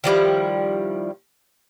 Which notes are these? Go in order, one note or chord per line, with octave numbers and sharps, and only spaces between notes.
D#3 F3 G3 E4